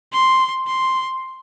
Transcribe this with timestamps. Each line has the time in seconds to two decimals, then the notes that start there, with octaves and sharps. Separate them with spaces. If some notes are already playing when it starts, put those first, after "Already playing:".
0.13 C6
0.67 C6